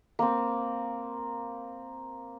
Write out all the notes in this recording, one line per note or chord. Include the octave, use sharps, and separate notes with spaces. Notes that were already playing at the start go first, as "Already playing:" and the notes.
A#3 C4